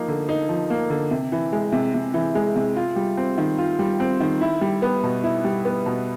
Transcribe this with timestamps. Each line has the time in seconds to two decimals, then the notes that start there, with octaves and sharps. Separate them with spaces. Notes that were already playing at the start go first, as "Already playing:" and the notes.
Already playing: F3 A#3 D#4
0.08 D3
0.29 D#4
0.49 F3
0.70 A#3
0.90 D3
1.11 C3
1.32 E3
1.53 G#3
1.72 C3
1.94 C3
2.14 E3
2.35 G#3
2.56 C3
2.76 F4
2.96 G3
3.17 C4
3.38 D#3
3.58 F4
3.79 G3
4.00 C4
4.20 D#3
4.41 E4
4.61 G3
4.82 B3
5.03 B2
5.24 E4
5.44 G3
5.65 B3
5.86 B2